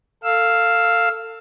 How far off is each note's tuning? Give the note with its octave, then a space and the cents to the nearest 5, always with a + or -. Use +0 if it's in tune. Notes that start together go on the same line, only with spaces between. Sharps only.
A4 +30 F5 +0 E6 +0